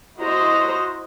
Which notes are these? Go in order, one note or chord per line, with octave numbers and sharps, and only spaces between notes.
E4 F#4 C5 D#5 A#5